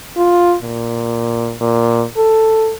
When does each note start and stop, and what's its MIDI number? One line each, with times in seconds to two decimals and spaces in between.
0.17 0.55 65
0.62 1.55 46
1.61 2.04 46
2.17 2.74 69